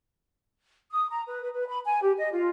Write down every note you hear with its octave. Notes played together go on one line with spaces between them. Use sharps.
D#6
A#5
B4
B4
B4
B5
G#5
G4
D#5
F4